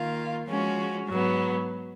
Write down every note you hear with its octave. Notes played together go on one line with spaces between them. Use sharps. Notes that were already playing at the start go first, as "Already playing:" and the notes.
Already playing: D#3 A#3 F4
F3 G#3 C#4 F#4
G#2 F#3 B3